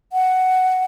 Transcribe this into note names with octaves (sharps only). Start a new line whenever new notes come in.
F#5